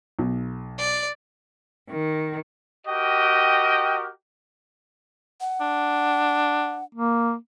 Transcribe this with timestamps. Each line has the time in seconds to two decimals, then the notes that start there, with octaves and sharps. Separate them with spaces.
0.19 B1
0.79 D5
1.89 D#3
2.87 F#4 G4 A#4 D#5 G5
5.41 F#5
5.61 D4
6.95 A#3